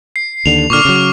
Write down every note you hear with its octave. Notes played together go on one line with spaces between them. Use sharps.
C7
D#2 D3 F7
A#2 D3 C#6 D6 F6
C#3 F#3